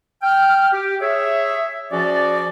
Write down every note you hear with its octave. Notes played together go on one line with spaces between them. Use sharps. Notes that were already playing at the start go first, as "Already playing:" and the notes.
G5 F6
G4
G#4 C#5 E5
F3 C#4 F#4 G#4 D5